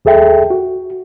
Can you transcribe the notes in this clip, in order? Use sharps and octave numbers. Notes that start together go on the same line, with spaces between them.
D#2 G#4 A4 E5 G5
F#4